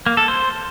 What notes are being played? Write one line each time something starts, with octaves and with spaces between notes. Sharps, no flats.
A#3
A4
C5